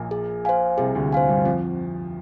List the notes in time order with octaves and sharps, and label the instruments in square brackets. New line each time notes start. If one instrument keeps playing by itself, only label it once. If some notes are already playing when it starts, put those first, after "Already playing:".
Already playing: [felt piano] A#1 A#2
[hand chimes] G#4
C5 F5 G#5
[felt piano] C2 C3 [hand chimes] G#4
[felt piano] D2 D3
[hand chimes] C5 F5 G#5
[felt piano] G2 G3
[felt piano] F2 F3 [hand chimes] C4